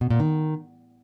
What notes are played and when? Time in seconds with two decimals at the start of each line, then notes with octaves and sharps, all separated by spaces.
0.01 B2
0.10 A#2
0.20 D#3